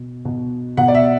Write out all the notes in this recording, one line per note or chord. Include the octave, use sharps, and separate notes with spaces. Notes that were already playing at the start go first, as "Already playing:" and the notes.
Already playing: B2
B2
B2 F#5
D5
E5